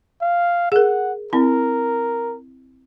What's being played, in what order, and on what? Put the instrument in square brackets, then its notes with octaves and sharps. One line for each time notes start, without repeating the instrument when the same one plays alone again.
[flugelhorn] F5
[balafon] G#4 A#4 [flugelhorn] F#5
[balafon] C4 E4 [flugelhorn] A#4